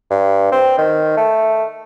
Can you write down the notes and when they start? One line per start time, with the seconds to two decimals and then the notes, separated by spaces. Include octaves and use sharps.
0.11 G2
0.52 C4
0.78 D#3
1.17 A3